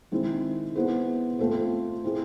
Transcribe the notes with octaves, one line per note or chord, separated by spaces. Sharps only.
D#3 G#3 C4 E4
B3 E4 G#4 C5
A3 C4 F4 A4 C5
C4 E4 G#4